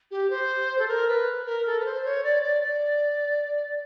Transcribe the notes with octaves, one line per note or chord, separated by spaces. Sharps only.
G4
C5
A4
A#4
B4
A#4
A4
B4
C5
C#5
D5
D5
D5